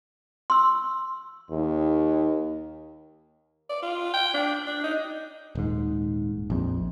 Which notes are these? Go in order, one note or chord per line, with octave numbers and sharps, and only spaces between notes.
C6 E6
D#2
D5
F4
G5
D4
D4
D#4
D#1 G#2
A#1 F2